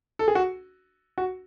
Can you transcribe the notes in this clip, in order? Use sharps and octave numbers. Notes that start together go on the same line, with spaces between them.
A4
G#4
F#4
F#4